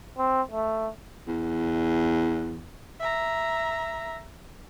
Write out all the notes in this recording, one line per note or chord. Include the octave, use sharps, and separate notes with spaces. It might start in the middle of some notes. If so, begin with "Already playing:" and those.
C4
A3
E2
E5 A#5